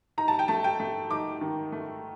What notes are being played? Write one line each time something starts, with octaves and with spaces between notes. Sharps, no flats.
D#4 A#5
A5
G5
A3 A5
G5
A3
D#4 D6
D#3
A3